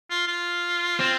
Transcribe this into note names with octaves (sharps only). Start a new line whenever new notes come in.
F4
F4
C4